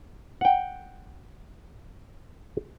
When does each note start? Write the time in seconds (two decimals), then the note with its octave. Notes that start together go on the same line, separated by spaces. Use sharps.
0.41 F#5 G5